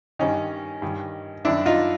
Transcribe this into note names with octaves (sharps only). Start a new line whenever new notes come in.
G2 D#3 C#4 D#4
G2 D#3
F#2 D#3 D4 E4
D#4 F4